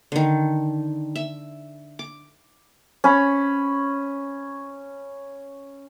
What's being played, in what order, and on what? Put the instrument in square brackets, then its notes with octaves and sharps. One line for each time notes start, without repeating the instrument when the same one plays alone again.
[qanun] D3 D#3
E5
D6
[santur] C#4 B5